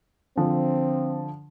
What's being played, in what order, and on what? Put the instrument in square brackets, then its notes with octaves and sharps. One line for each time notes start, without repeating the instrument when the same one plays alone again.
[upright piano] D3 F3 [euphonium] C4